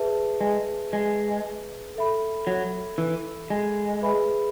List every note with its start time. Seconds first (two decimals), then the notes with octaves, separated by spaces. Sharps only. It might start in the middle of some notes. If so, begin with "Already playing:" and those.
Already playing: G#4 B4 E5 A5
0.41 G#3
0.93 G#3
1.96 A4 E5 B5
2.47 F#3
2.98 E3
3.50 G#3
4.01 G#4 B4 E5 B5